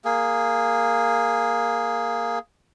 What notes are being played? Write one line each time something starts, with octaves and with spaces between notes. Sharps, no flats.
A#3 G#4